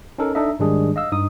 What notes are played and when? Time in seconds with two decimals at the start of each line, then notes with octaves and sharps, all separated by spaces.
0.18 C#4 D#4 A4 A#4
0.35 D4 D#4 A4 D#5 E5
0.59 G#2 D#3 G3 G#3 D4 G#4
0.96 D#5 F5 E6
1.12 G2 D#4 D#6